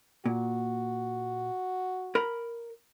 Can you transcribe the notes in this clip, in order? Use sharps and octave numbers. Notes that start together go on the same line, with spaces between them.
A#2 F#4
A#4 B5